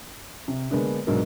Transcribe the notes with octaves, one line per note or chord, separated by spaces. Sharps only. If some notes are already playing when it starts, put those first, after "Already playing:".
C3
D3 G#3 A#3 B3 D4
G#2 B2 F#3 D4 A#4